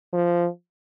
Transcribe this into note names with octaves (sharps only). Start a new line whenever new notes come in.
F3